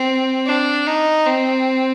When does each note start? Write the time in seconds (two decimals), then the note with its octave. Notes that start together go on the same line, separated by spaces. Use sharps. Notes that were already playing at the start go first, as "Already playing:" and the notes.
Already playing: C4
0.46 D4
0.87 D#4
1.26 C4